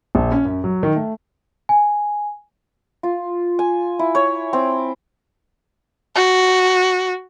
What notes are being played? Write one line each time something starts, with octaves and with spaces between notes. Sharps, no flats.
A#1
C#4
F#2
F#3
D#3
A3
G#5
F4
G#5
E4
C#5
C4
F#4